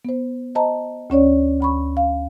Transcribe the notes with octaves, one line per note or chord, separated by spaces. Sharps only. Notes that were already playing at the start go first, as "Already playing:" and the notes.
B3 C5
C5 D#5 A5 A#5
D2 C#4 C#5 D5
D2 B5 C#6
F5